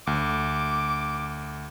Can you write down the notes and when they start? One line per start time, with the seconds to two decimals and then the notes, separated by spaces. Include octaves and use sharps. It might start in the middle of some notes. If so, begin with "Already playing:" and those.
0.07 D2 D6